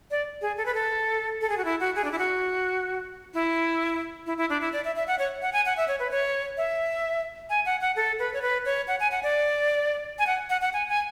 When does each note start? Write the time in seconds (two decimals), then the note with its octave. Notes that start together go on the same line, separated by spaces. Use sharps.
0.11 D5
0.41 G#4
0.57 A4
0.66 B4
0.75 A4
1.41 A4
1.49 G#4
1.58 F#4
1.65 E4
1.80 F#4
1.95 G#4
2.05 D4
2.12 E4
2.19 F#4
3.34 E4
4.26 E4
4.38 E4
4.50 D4
4.61 E4
4.73 D5
4.84 E5
4.96 E5
5.07 F#5
5.19 C#5
5.42 F#5
5.53 G#5
5.66 F#5
5.77 E5
5.88 C#5
6.00 B4
6.11 C#5
6.57 E5
7.50 G#5
7.66 F#5
7.81 F#5
7.96 A4
8.19 B4
8.34 C#5
8.42 B4
8.65 C#5
8.88 F#5
9.00 G#5
9.12 F#5
9.23 D5
10.19 G#5
10.27 F#5
10.50 F#5
10.61 F#5
10.73 G#5
10.89 G#5